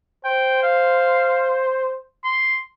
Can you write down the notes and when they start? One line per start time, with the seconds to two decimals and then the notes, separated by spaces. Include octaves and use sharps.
0.25 C5 G5
0.63 F5
2.24 C6